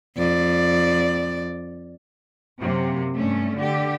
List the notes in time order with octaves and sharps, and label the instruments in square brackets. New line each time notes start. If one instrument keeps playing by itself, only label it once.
[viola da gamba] F2 D5
[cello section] F#2 C3 A#3
G2 A3 C#4
D3 G4